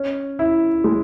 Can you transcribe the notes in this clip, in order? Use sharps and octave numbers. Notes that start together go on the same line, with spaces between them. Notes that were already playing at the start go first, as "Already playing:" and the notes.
Already playing: C#4
E4
G#3